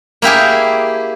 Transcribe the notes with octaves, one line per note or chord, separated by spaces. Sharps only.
A#3 E4 G4 G#4